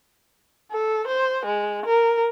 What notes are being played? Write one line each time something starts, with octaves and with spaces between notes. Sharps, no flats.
A4
C5
G#3
A#4